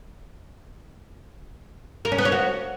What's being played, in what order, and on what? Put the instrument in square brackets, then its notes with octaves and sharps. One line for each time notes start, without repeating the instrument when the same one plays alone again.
[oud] A#4
C#4
B3
C#5
F#4